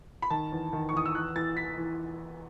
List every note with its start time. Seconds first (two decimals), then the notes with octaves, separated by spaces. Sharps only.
0.22 B5
0.30 D#3 A5
0.52 E2
0.73 D#3
0.89 C#6
0.93 E2 D#6
1.06 E6
1.14 E3 F#6
1.36 E3 A6
1.56 E3 B6
1.78 E3